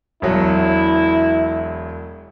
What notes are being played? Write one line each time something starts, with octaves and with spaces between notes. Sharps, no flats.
E1 F#3 E4